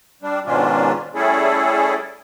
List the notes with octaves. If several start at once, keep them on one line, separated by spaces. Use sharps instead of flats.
G3 D4
G#2 B2 D#3 C#4 D4 F4
G3 A3 C#4 E4 G#4 A4